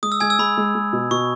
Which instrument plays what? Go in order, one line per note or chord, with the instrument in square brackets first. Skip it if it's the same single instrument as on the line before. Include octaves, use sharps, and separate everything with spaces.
[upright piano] G#3 [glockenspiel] D#6
[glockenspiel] E6
[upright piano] G#3 [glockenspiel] G#5 G#6
[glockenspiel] E6
[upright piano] G#3 [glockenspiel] B5
[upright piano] G#3
G#3
B2
[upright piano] B2 [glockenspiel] C#6